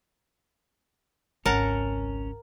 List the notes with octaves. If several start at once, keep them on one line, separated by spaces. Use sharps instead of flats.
G#1 C#2 C#4 A#4 F#5 A5